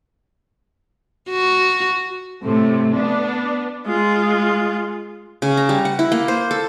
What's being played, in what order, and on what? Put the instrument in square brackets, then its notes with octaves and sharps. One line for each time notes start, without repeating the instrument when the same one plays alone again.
[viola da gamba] F#4
[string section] A2 C3 A3
B3 D4
[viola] G#3 F4
[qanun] C#3
A#5
G3
F#5
E4
A#3
C5
A4